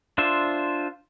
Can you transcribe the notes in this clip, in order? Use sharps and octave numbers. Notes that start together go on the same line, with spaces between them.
D4 F4 C5 E5